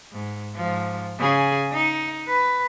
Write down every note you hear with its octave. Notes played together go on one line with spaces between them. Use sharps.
G#2
G#2 F3
C#3 G#4
D#4
B4